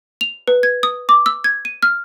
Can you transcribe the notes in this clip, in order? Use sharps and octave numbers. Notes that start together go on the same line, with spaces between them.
F7
B4
G#6
D#6
D6
E6
G#6
D#7
F6